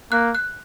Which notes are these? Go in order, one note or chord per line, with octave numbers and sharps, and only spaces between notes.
A#3 F#6
F#6